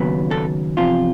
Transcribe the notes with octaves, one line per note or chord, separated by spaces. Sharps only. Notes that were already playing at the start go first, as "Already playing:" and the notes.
Already playing: D#2 C#3 F#3 B3
A4
E2 C3 F3 F4